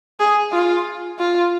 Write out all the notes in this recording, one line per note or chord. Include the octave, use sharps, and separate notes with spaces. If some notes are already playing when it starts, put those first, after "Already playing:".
G#4
F4
F4